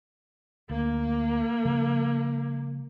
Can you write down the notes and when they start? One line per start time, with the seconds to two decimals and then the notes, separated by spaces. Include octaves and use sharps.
0.70 D2 A#3
1.65 C#3 F3 G#3